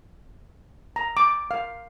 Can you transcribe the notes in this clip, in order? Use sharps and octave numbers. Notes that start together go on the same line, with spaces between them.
A#5
D6
F5